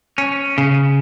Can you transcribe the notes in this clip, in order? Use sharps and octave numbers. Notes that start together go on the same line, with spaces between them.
C#4
C#3